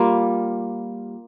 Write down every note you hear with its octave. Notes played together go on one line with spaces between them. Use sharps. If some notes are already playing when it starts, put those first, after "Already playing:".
Already playing: G3 A#3 F4